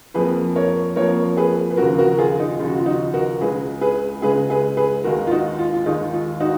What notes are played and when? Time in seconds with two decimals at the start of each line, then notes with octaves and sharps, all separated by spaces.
0.14 F2 F3 A#3 G#4 B4
0.55 A#4 C#5
0.96 F2 F3 A#3 A#4 C#5
1.37 G#4 B4
1.70 B4
1.77 D#2 C#3 F3 F#4 A#4
1.98 F#4 A#4
2.09 A#4
2.18 F4 G#4
2.40 D#4
2.59 D#2 C#3 F3 F4
2.68 F#4
2.78 F4
2.86 D#4 F#4
3.14 F#4 A#4
3.41 C#2 C#3 G#3 G#4 B4
3.81 G#4 B4
4.22 C#2 C#3 G#3 G#4 B4
4.50 G#4 B4
4.77 G#4 B4
5.04 D#2 D#3 G#3 F#4 A#4
5.27 F4
5.31 D#4 F#4
5.59 F4
5.74 F4
5.86 D#2 D#3 G#3 D#4
6.14 F4
6.40 D#4 F#4